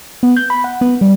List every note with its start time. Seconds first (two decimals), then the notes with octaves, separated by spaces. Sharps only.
0.23 B3
0.36 G6
0.50 B5
0.64 F#5
0.81 B3
1.01 G3